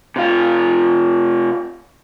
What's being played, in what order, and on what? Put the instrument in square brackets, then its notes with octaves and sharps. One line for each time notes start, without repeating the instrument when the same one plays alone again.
[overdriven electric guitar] C3 F4